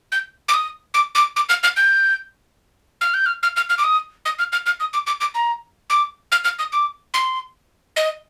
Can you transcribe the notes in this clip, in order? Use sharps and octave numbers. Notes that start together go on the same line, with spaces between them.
G6
D6
D#6
D6
D6
D6
F6
F6
G6
F6
G6
F6
F6
F6
F6
D6
D#6
D#6
F6
F6
F6
D#6
D6
D6
D6
A#5
D6
F6
F6
D#6
D6
C6
D#5